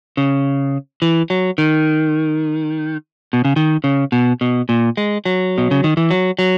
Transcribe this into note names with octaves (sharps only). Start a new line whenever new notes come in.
C#3
E3
F#3
D#3
B2
C#3
D#3
C#3
B2
B2
A#2
G#3
F#3
B2
C#3
D#3
E3
F#3
F#3